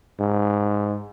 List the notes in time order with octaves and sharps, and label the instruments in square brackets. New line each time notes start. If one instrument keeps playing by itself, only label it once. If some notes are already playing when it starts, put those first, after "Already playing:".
[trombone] G#2